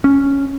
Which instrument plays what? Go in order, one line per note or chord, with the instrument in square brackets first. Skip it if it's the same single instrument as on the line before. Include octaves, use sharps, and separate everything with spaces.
[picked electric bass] C#4